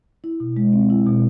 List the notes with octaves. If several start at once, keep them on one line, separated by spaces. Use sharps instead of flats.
E4
B2
G#3
C4
E4
B2